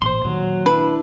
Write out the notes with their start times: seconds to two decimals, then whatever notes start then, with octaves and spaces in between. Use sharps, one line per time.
0.02 A1 A#2 C5 C6
0.25 A#2 D#3 F#3 A#3
0.66 D4 E4 B4